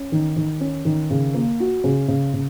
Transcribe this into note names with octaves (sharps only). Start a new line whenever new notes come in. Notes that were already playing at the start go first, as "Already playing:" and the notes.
Already playing: C#4
D#3
D#3
C#4
D#3
C#3
A#3
F#4
C#3
C#3
C#3